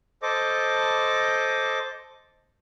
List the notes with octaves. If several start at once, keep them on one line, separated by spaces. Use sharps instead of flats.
A4 C5 D#5 D6